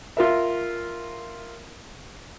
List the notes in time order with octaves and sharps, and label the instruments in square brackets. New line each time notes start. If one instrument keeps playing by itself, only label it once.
[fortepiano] F4 A#4 E5